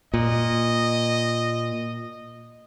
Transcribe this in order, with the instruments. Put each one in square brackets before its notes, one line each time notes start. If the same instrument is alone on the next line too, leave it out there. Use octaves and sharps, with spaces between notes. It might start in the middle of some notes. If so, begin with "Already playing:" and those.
[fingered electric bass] A#2 [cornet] D#5